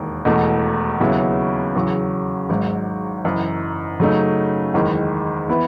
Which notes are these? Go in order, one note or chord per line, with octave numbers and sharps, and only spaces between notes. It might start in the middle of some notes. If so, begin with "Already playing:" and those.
Already playing: E1 D#2 D#3
E1 E2 B2 A3
D#2 C#3 F#3 B3 E4
E2 C#3 F#3
G#1 G#2 F#3
F#1 F#2 E3
C#3 F#3 A3 D#4
F#1 E2 D#3 G#3
E3 B3 E4 B4